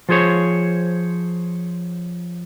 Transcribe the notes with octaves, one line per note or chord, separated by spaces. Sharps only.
F3 F4 G#4 C5 C#5